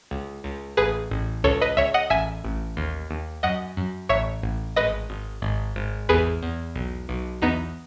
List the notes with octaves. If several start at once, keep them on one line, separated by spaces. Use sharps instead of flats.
C#2
C#2
A1 G#4 B4
A1
C#2 A4 C#5
B4 D#5
C#2 C#5 E5
D#5 F#5
A1 E5 G#5
A1
D#2
D#2
F#2 D#5 F#5
F#2
A1 C#5 E5
A1
G#1 B4 D#5
G#1
G#1
G#1
E2 G#4 B4
E2
B1
B1
E2 B3 D#4